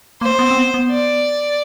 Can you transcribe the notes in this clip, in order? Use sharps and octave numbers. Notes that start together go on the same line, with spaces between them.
A#3 C5
B3
C4
B3
B3
D5